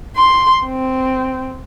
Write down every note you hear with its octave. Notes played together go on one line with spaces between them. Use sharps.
C6
C4